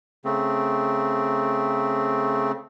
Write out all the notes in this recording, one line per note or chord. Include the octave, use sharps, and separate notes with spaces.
C#3 A3 C4